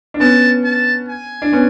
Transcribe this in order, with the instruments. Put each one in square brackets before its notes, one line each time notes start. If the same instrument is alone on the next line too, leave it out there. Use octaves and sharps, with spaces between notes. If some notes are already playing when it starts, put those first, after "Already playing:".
[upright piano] D4
[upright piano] B3 C#4 [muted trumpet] A5
[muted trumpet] A5
G#5
[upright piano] D4
B3 C#4